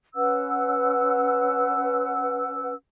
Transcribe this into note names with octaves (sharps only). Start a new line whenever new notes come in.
C#4 B4 F#5 E6